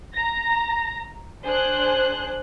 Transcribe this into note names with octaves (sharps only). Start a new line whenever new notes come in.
A#5 A#6
D4 G#4 C5 F#6